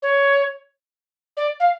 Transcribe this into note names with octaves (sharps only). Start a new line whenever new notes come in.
C#5
D5
F5